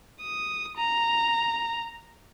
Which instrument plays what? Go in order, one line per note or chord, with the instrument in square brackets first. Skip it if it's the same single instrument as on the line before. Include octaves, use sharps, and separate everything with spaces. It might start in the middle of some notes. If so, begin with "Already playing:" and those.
[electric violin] D#6
A#5